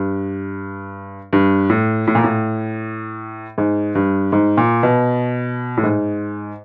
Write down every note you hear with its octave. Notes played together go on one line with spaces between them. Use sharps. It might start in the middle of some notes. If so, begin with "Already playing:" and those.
Already playing: G2
G2
A2
A2
A#2
A2
G#2
G2
G#2
A#2
B2
A2
G#2